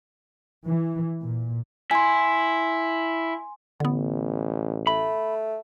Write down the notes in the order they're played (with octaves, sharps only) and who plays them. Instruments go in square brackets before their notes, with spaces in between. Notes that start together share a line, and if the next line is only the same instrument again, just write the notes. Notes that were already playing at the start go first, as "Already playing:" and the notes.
[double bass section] E3
A#2
[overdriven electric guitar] E4 [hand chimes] G#5 C6
[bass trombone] A1 [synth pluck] D3 B3
[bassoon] A3 [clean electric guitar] B5